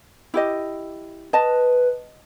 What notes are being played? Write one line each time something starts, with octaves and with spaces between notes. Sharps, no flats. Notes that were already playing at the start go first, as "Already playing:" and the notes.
E4 G4 D#5
B4 D#5 A5